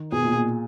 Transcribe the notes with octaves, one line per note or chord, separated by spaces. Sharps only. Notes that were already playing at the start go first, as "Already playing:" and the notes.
Already playing: D#3
B2 G#4
A#2
A#2